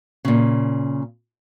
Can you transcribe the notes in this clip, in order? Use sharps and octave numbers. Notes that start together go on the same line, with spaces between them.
A#2 C#3